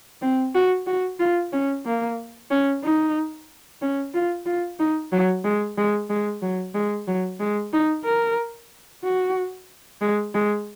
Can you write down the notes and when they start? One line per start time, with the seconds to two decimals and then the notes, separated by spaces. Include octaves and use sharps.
0.22 C4
0.55 F#4
0.87 F#4
1.19 F4
1.53 C#4
1.86 A#3
2.50 C#4
2.84 D#4
3.82 C#4
4.14 F4
4.46 F4
4.79 D#4
5.12 F#3
5.44 G#3
5.78 G#3
6.10 G#3
6.42 F#3
6.74 G#3
7.08 F#3
7.40 G#3
7.73 D#4
8.05 A#4
9.04 F#4
10.01 G#3
10.35 G#3